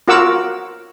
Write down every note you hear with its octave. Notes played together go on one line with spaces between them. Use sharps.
F4 F#4 A#4 F#5 D6 E6